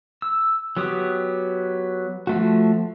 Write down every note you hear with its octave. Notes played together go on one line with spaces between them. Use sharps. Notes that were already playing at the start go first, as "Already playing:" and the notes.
E6
F#3 B3 G4 D#6
F3 A3 F#4